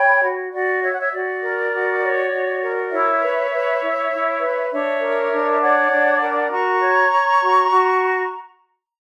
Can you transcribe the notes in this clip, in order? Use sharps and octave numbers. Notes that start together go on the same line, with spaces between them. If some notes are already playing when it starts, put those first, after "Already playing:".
Already playing: C#5 G5 B5
F#4
F#4 D5
C#5 E5
F#5
C#5 E5
F#4 D5
A#4
F#4
C#5
F#4
A#4
E4 C#5 E5
B4
B4
E4
E4
B4
D4 C#5 E5
A#4
D4
E5
C#5 D5 F#5
D4
A#4
F#4 A#5 C#6
C#5
C#5
F#4
F#4